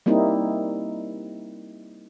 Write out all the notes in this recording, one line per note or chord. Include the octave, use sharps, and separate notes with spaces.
G3 A#3 C4 D#4 E4